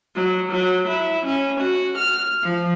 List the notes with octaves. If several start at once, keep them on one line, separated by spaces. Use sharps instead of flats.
F#3
F#3
E4
C#4
F#4
F6
F3